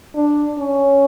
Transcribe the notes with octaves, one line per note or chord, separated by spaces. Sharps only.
D4
C#4